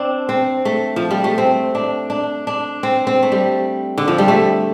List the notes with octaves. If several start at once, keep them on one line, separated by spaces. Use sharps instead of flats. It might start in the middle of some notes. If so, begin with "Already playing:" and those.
Already playing: C4 D4
C4
A3
F3
G3
A3
C4
D4
D4
D4
C4
C4
A3
G3
D3
F3
G3
A3